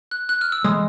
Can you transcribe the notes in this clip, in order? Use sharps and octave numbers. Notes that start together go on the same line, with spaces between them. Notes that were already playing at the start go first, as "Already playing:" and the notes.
F#6
F#6
F6
E6
E3 G#3 D#6